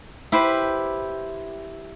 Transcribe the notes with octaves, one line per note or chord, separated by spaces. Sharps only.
E4 G4 B4 C5